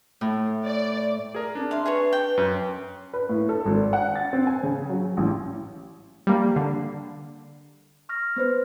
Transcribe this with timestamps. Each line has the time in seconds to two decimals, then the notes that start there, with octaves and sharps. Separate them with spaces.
0.21 A2
0.65 D5
1.35 G#4 A#4
1.55 C4 D4
1.71 E5 F5 C6
1.86 G#4 B4 C#5 C#6
2.13 G5
2.37 F#2
3.14 B4
3.29 A2
3.49 A4
3.65 G#1
3.93 F#5
4.16 A6
4.33 C4
4.47 G#5
4.63 C#3
4.90 F#3
5.17 A1
6.27 G3 A#3
6.56 D3 C7
8.09 C#6 F6 A#6
8.36 B3 B4 C5